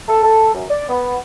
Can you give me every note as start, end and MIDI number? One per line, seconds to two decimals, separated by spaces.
0.08 0.22 69
0.23 0.50 69
0.54 0.63 42
0.70 0.84 74
0.89 1.17 59